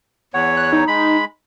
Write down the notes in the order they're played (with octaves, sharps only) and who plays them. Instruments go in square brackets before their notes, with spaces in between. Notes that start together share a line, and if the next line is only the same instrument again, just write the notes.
[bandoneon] E2 C#5 [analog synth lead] F#5
[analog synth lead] F#6
D#4
[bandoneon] G#3 B5